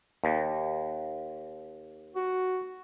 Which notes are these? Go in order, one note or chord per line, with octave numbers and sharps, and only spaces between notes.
D#2
F#4